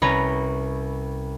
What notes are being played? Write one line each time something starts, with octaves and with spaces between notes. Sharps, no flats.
C2 C#4 B4 C#5 A#5